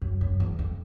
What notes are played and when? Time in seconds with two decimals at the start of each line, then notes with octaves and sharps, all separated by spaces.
0.02 F#2
0.21 F#2
0.40 E2
0.59 F2